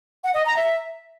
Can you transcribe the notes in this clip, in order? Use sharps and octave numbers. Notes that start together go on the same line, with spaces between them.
F#5
D#5
A#5
E5